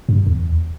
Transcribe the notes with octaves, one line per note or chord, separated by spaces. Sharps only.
G2
E2